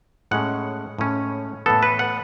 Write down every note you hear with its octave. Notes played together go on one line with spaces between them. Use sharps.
A2 G#3 C#4 F#5
A2 G#3 C#4
A2 E3 B3 A4
B4
F#5